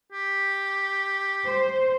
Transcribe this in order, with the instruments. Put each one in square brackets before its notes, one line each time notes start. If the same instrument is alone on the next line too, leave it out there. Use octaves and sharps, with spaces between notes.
[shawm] G4
[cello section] C5